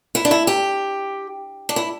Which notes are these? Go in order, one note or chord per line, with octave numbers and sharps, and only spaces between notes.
E4
D4
E4
G4
D4
E4